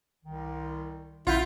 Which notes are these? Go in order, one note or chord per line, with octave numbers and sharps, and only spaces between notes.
C2 D#3
A#1 E4 F4 F#5 G6